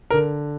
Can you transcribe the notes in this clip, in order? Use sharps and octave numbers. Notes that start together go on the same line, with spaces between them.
A#4
D3